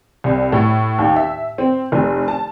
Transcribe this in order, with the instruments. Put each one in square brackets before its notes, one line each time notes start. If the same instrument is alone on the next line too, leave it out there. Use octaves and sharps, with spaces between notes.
[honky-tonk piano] C2
A2
D#2
E5
C4
F1
A5